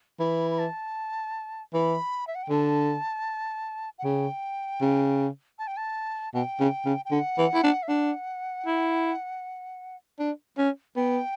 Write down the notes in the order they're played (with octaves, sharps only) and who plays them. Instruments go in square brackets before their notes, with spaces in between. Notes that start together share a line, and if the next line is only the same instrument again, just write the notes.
[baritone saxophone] E3 [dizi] B5
[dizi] B5
A5
[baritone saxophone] E3 [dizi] B5
[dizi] E5
F#5
G5
[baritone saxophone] D3 [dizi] A5
[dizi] F#5
[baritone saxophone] C#3 [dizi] G5
[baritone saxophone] C#3
[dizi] A5
G5
A5
[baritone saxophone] B2 [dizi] G5
[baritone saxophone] C#3
C#3
[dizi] G5
[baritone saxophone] D3 [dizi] F#5
[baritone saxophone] E3
E4
D4
[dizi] E5
[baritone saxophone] D4 [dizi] F#5
[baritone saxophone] E4
D4
C#4
[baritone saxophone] B3 [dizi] G5